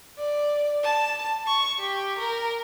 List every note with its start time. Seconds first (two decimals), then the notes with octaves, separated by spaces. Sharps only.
0.18 D5
0.83 A5
1.47 C#6
1.80 G4
2.18 A#4